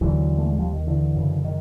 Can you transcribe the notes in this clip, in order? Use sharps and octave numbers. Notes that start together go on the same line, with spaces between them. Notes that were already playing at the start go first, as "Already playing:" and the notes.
D#2 D3 E3 F#3
A3
G#3
F3 G3
D#3
D3 E3
F#2 C#3
D#3